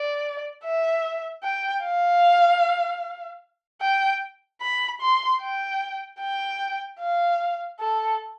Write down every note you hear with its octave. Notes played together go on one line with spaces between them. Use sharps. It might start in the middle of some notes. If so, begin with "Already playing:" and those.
Already playing: D5
E5
G5
F5
G5
B5
C6
G5
G5
F5
A4